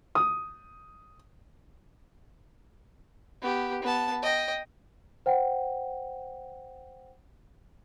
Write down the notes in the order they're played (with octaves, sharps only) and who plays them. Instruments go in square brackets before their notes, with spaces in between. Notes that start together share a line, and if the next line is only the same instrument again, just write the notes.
[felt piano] D#6
[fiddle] B3 G4
B3 A5
D#5 G5
[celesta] C5 F#5 G5